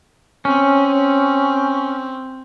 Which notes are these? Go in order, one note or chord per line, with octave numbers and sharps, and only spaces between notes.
C4 C#4